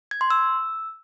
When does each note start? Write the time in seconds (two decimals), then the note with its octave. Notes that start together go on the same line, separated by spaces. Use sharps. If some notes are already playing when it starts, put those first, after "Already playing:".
0.11 G#6
0.21 C6
0.30 E6